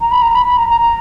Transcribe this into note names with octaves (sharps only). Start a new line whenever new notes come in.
A#5
B5
A#5
B5
B5
A#5
A#5
A#5